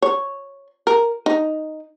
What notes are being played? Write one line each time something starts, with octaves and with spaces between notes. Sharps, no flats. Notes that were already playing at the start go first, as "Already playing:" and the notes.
C#5
A#4
D#4